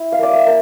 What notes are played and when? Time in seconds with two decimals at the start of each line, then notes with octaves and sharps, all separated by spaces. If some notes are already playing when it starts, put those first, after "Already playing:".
Already playing: E4
0.12 F5
0.19 A#3 D5
0.33 E5
0.47 A#3